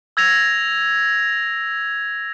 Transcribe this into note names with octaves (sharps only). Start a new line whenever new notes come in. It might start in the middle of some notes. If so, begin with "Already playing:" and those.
E6 G#6 A#6 F7